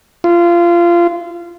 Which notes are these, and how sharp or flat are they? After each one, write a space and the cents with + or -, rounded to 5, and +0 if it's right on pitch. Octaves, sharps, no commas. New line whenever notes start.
F4 -25